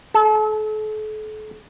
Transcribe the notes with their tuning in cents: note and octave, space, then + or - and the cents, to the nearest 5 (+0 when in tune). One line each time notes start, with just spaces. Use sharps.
A4 -40